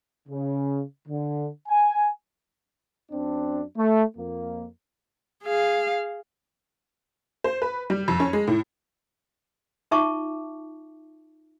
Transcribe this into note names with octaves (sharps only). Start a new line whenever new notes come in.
C#3
D3
G#5
F#2 C4 D4
A3
F2 A#3
G#4 F5
C5
B4
G3
F2
C#4
G#3
A2
D#4 F4 E5 A5 C#6 D6